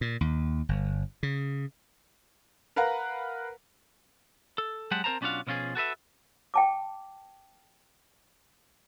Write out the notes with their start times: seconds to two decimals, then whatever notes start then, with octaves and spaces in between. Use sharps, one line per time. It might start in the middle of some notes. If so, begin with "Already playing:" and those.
0.01 A#2
0.21 D#2
0.69 G1
1.23 C#3
2.76 A#4 B4 F5 F#5 A#5
4.58 A4
4.91 F#3 G#3 G4 F#5 A5
5.04 C4 A#4 C5 A5 A#5
5.21 B1 C#4 D4 F4 F#4 F5
5.47 B2 F3 C#4 F4 G#4
5.75 F#4 A4 B4 E5
6.54 G5 A5 D6